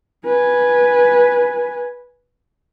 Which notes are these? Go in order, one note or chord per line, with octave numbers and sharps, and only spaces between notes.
B4 G#5